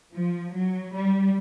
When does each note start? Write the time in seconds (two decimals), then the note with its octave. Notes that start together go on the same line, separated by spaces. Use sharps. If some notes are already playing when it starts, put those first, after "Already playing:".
0.13 F3
0.53 F#3
0.93 G3